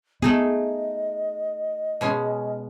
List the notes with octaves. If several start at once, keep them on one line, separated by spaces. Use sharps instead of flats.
A3 B3 D#4 G#4 D#5
B2 G#3 C#4